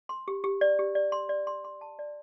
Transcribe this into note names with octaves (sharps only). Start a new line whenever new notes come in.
C6
G4
G4
D5
G4
D5
C6
D5
C6
C6
A5
D5